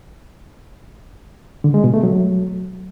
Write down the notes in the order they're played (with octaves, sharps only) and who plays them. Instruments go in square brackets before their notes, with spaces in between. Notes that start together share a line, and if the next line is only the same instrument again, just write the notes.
[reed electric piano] D3
G#3
B2
A3
F#3